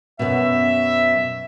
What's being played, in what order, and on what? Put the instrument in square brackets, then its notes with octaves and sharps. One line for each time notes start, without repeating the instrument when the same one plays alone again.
[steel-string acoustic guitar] F#2 B2 [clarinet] E5